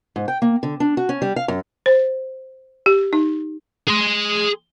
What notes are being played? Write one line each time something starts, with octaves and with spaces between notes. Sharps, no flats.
G#2
G5
A#3
D3
D4
F#4
C#4
G3
F5
F#2
C5
G4
D#4
G#4 C6